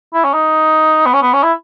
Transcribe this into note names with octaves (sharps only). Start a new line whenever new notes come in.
E4
C#4
D#4
B3
C#4
B3
C#4
E4